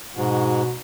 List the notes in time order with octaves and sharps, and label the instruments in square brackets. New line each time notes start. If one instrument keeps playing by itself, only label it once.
[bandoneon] G#2 [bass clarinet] B2 [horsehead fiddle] F#4